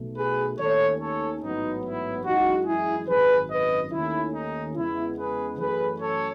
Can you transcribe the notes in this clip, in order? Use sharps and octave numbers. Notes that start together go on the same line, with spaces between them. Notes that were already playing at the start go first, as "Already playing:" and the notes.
Already playing: B1 B2 A3
G#4 B4
D#2 D#3 A3 C#4 A4 C#5
A4 C#5
A1 G#2 F#3 B3 D#4
E4
F#2 E3 G#3 D#4 F#4
E4 G#4
G#1 F#2 C#3 G#4 B4
B4 D#5
D#2 D#3 A3 C#4 E4
D#4
E2 C#3 G#3 B3 E4
G#4 B4
F#2 E3 A3 C#4 G#4 B4
A4 C#5